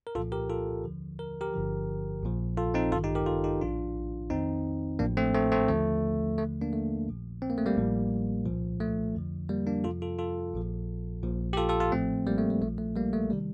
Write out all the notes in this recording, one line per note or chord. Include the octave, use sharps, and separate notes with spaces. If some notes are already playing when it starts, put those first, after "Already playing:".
A#4
C2 A#2 F3 F4 A4
G4 A#4
F4 A4
D#2 D3 F3
A#4
G4 A#4
G1 G2 D3 F3
A#1 A#2 F3
F4 A4
C4 D#4
A1 G2 D#3 F4 A4
D#4 G4
G4 A#4
F4 A4
D#4 G4
A#1 A2 F3 D4 F4
F2 D#3 C4 D#4
A1 A2 F3 A#3 D4
A3 C4
A3 C4
A3 C4
D#2 D3 F3 A3
D#2 D3 F3 A3
A#3 D4
A3
A#1 A#2 F3
C4
A#3
A3
G3 A#3
A1 A2 F3
C2 A#2 F3
A3
F2 D3 F3
G3 A#3
A#3 D4
F2 C3 F3 F4 A4
F4 A4
F4 A4
A#1 A#2 F3
A#1 A#2 F3
G4
F4 A4
F4 A4
F4 A4
A1 A2 F3 A3 C4
G3 A#3
A3
G3
A#1 A#2 F3 A3
A3
G3 A#3
A3
C3 D#3 G3